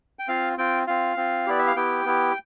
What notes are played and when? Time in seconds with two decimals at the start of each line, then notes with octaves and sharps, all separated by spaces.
0.19 G5
0.28 C4 F4 F5
0.58 C4 F4 G5
0.87 C4 F4 F5
1.17 C4 F4
1.47 B3 E4 G4 D5
1.59 E5
1.67 F5
1.76 B3 E4 G4 G5
2.05 B3 E4 G4